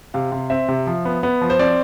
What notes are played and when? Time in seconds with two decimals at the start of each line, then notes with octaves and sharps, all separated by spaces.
0.14 C3 F5
0.32 C3
0.50 C4 E5
0.68 C3
0.87 F3
1.05 B3
1.23 B3
1.41 F3
1.50 C5
1.59 C4 D5